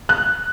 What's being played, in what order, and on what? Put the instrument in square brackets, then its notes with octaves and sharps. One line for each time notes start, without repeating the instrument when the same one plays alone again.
[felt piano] F#6